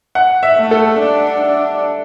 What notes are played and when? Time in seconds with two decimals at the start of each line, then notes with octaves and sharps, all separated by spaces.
0.15 F#5
0.43 E5
0.58 A3
0.71 A4
0.99 D4
1.42 D4